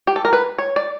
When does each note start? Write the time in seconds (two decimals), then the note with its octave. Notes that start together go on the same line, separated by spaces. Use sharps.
0.07 G4
0.16 A4
0.25 A#4
0.33 B4
0.58 C#5
0.76 D5